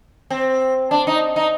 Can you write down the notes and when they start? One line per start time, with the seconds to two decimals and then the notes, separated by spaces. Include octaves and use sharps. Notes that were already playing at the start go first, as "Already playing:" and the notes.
0.30 C4
0.91 D4
1.07 D#4
1.36 D#4